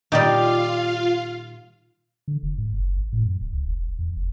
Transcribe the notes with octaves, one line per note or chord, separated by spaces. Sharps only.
A#2 D#3 G3 D#4 F4 G4 D5 F5
D3
E1
G#2
F#1
G#1
A2
F#2
D1
C#2
E1
E2
F1